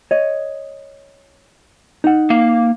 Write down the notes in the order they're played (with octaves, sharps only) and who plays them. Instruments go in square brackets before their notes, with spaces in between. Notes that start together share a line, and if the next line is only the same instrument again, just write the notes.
[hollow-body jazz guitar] C#5 D#5
D#4 F#5
[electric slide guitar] A#3 F5